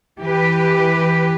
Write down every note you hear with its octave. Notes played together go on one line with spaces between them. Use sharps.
E3 G4 B4